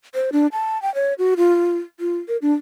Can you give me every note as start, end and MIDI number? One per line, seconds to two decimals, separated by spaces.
0.15 0.30 72
0.32 0.47 62
0.52 0.80 81
0.82 0.93 79
0.95 1.14 73
1.18 1.34 66
1.37 1.77 65
2.00 2.17 65
2.28 2.37 70
2.42 2.53 62